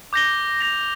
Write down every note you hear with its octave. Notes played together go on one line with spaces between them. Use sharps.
D6 G6 A#6 G7
A#6 F7